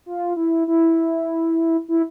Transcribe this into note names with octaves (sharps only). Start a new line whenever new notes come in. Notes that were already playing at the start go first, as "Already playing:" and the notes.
F4
E4
E4
E4